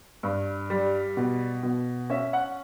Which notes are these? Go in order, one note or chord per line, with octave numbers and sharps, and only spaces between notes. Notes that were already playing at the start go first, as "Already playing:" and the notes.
G2
G3
B2
B2
C#4 E5
F#5